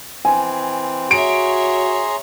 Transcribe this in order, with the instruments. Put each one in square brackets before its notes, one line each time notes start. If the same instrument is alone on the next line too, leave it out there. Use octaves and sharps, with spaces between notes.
[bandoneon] E3 C4 [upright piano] G#5
[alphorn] F#4 [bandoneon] G#4 A#5 C6 [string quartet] C#5 E5 [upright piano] D7